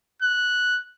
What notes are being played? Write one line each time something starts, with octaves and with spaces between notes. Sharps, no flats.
F#6